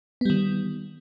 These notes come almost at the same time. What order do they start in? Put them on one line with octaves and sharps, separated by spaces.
B3 G3 D#3